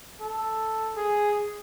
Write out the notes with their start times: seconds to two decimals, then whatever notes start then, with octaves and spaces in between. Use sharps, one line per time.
0.20 A4
0.96 G#4